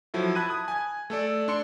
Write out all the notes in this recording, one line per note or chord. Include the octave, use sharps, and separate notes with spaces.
F3 F#3 E4 A4
A5 B5 F#6 G#6 D#7
D#6
G#5 G#6
A3 A4 D5
D4 C6 C#7